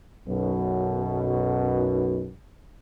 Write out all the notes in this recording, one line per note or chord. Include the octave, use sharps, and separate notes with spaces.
B1 F#2 B2